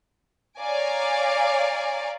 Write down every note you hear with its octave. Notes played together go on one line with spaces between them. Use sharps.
C#5 D5 F5 G#5 A#5 D6